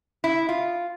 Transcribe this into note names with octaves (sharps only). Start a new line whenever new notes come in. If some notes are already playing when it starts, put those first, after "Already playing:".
E4
F4